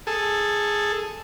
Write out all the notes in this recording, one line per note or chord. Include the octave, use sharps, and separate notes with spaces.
G#4 A4